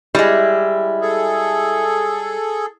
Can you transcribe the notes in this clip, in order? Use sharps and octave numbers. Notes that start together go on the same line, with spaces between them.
G3 G#3 E4
G#4 A4